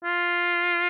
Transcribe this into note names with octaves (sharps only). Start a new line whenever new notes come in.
F4